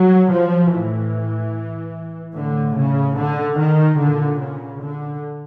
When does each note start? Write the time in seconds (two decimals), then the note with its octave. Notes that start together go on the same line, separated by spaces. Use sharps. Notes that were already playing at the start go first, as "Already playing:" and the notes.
Already playing: F#3
0.31 F3
0.72 A2 E3
2.35 A2 D3
2.76 C#3
3.17 D3
3.58 D#3
3.99 A#2 D3
4.39 C#3
4.81 D3